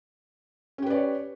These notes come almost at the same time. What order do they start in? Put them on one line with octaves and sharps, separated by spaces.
C#4 G4 B4 D5 C#5